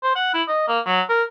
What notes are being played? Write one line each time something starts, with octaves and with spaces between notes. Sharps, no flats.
C5
F#5
E4
D#5
A#3
F#3
A#4